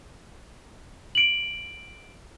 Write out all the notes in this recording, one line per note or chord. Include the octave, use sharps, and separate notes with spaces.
D7 F#7